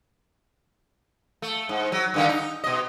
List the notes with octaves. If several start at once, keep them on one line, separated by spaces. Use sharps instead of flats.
A3
G#2
F#3
G2 D3 D#3
D#4
B2 D#5